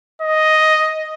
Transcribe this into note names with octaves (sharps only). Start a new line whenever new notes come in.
D#5